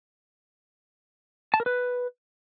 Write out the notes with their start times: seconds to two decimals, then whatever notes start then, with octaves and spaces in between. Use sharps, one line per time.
1.54 A5
1.60 A#4
1.66 B4